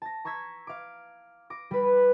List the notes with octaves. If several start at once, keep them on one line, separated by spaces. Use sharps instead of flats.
A5 A#6
A#5 C#6 E6 G#6 B6
F5 D6
D6 A#6
G3 B4